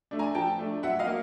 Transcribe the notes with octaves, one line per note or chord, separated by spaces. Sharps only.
A3 D4
G#5 A#5
F3 G5 A5
A3 D4
F#3 E5 F#5
D#5 F5
A#3